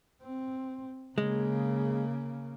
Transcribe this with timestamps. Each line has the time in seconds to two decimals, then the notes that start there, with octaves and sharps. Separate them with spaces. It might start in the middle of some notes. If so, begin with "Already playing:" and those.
0.22 C4
1.18 C#3 G#3 A#3